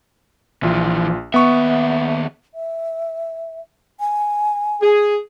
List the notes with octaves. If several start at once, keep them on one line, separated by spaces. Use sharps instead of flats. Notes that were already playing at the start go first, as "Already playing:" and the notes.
A#1 E3 F3 F4
D#2 B3 E5 C#6
E5
G#5
G#4